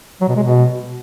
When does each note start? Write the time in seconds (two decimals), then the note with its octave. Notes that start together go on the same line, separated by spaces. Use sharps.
0.21 F#3
0.29 B2
0.36 G#3
0.43 B2